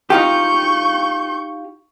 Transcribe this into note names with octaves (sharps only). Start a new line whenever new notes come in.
D#4 F4 G4 C#6 G6